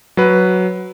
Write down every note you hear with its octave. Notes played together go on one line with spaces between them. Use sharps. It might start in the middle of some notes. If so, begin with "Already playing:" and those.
F#3 B4